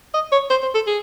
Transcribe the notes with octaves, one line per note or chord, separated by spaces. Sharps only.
D#5
C#5
C5
C5
A4
G#4